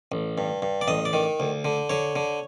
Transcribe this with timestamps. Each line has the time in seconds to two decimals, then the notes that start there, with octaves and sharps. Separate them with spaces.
0.12 A1
0.38 G2
0.62 G2
0.81 D5
0.88 A1 D#5
1.05 D5
1.13 D#3
1.40 D2
1.65 D3
1.89 D3 C#5
2.16 D3